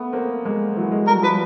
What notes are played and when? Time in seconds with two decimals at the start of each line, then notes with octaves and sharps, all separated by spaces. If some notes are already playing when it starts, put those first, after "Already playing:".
Already playing: A3 B3
0.13 A#3 C4
0.45 G#3 A#3
0.77 E3 F#3
0.92 G#3
1.02 G3
1.07 A#4
1.11 F#3
1.22 F3 G3 B4